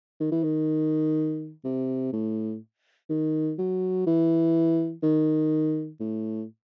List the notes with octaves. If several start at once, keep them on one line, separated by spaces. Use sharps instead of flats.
D#3
E3
D#3
C3
A2
D#3
F#3
E3
D#3
A2